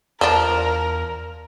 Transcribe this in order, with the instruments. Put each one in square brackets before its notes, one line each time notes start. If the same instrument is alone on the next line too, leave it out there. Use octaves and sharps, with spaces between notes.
[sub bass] E2 [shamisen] F3 D4 [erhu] A#4